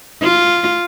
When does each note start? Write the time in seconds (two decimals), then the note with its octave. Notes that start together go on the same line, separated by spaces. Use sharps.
0.23 F4